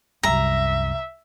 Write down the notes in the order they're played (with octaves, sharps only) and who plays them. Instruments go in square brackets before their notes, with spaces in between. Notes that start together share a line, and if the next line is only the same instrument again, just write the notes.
[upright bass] C2 F#2 [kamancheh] E5 [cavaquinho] A#5